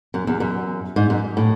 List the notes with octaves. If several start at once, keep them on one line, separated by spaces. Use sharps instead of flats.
F#2
E2
F#2
G#2
F#2
A2